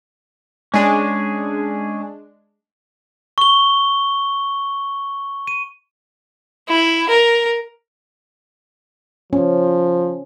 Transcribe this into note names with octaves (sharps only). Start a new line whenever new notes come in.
G#3 C#4 D4 G#4
C#6 G7
D#7
E4
A#4
F3 C#4